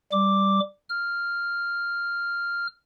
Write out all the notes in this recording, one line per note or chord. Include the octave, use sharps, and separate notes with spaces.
G3 D6
F6